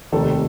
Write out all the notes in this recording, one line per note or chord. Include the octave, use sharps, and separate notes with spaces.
F1 D#2 D#3 A4